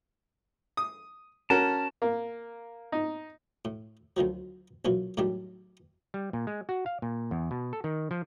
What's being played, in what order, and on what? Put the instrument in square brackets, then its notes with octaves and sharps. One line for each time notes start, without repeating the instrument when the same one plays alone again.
[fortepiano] D#6
[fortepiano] C#4 F#4 A#4 [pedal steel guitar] A5
[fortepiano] A#3
D#4
[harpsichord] A2
D2 D#3 F3 F#3
B1 A#2 E3 F#3
A2 D#3 F#3 G3 D4
[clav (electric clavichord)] G3
A#2
G#3
F#4
F5
A#2
E2
B2
A4
D#3
F3